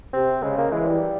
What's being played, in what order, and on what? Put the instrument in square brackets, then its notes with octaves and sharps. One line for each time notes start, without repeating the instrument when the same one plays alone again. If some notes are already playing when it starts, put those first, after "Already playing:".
[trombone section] C3 [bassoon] C4
[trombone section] C#3 [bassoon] G#3
[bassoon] A#3
[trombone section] E3 [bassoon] G#3
[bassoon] G3